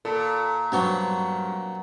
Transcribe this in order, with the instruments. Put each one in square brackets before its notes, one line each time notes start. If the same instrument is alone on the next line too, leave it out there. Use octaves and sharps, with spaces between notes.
[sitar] A#2 [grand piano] A4
[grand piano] G2 C#6 [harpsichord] F#3 B3 C4